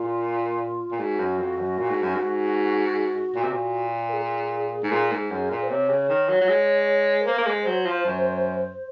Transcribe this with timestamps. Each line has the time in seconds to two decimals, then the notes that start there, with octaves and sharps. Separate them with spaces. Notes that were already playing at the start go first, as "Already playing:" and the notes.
Already playing: A#2 F4
0.91 A#2
0.99 G#2 F#4
1.19 F#2
1.39 F2
1.58 F#2
1.78 A#2
1.90 G#2
2.02 F#2
2.15 G#2
3.35 A#2
3.43 C3
3.51 A#2
4.09 A#4
4.13 G#4
4.83 G#2
4.92 A#2
5.12 G#2
5.31 F#2
5.51 A#2
5.62 C5
5.70 C3 C#5
5.90 C#3
6.09 D#3
6.29 F#3
6.41 F#3
6.49 G#3
7.21 A#4
7.27 A#3 C5
7.38 A#3
7.47 G#3
7.66 F#3
7.86 F3
8.05 F#2